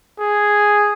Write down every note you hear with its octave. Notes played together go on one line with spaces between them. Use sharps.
G#4